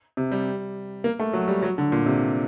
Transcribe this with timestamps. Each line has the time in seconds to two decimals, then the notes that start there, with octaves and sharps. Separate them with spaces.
0.17 C3
0.31 G3
1.04 A#3
1.19 A3
1.33 F#3
1.48 G3
1.62 F#3
1.78 D3
1.92 A#2
2.06 C3